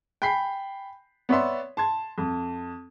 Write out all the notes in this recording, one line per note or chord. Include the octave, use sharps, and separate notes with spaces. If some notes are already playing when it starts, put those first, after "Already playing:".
G5 G#5 B5 B6 C7
B3 C#5 D5 E5 C6
A5 C6 G#6
F2